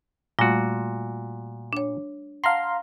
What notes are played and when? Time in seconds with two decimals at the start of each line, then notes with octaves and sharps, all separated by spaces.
0.39 A#2 G3 A3 F4 F#4
1.73 D4 C#5
2.44 F5 F#5 A5 A#5 C6